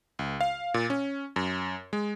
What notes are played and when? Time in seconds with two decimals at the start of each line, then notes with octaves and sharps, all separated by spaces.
0.19 C#2
0.41 F5
0.74 A#2
0.90 C#4
1.36 F#2
1.93 G#3